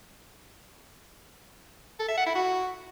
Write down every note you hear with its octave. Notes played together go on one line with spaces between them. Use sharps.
A4
E5
F#5
E4
F#4